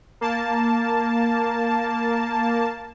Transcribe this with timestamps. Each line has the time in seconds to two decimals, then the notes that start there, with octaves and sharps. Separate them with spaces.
0.21 A#3 A5